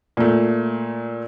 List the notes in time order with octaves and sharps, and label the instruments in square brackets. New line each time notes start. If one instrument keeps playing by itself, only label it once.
[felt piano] A#2 A3